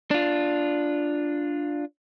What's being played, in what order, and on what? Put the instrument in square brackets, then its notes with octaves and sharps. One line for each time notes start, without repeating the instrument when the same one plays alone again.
[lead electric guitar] D4 F4